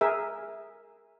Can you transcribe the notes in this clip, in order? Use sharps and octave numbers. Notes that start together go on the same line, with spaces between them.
G#4 A#4 E5